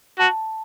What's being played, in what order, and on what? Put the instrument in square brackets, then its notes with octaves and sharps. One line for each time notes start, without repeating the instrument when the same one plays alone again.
[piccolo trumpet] F#4 [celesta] A5